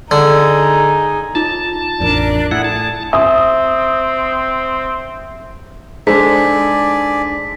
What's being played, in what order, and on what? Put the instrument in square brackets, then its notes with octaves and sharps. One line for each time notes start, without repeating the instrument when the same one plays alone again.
[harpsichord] D3 [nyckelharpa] D#4 G#4
[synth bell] D#4 F4 [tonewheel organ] A5
[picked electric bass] A1 F2 [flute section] D4 A#4 D5
[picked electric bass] A2 [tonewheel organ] E4 F#5 [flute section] G#4
[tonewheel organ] A5
[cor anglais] C4 [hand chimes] E5 [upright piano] D#6
[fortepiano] G#3 A4 C5 [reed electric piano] D4 D#4 [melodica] D5 G#5 [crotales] B6